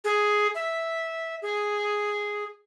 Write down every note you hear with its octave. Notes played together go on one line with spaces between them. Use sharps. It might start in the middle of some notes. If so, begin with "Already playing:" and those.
G#4
E5
G#4